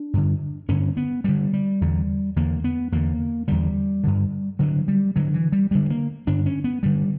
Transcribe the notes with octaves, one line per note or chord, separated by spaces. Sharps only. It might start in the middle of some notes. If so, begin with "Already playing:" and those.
Already playing: D4
G2 D3
G2 D3 C#4
B3
G2 D3 G3
G3
E2 D3
E2 D3 A#3
B3
E2 D3 A#3
E2 D3 G3
G2 D3
G2 D3 F#3
G3
G2 D3 F#3
E3
G3
G2 D3 G3
A#3
G2 D3 D4
C#4
B3
G2 D3 G3